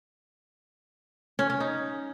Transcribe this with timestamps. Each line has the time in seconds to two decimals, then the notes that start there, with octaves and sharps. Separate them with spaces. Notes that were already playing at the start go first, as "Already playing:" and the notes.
1.39 C#4
1.50 C#4
1.60 D#4